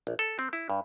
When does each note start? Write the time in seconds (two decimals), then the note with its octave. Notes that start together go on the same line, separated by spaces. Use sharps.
0.07 A#1
0.19 A4
0.39 C4
0.53 E4
0.70 G2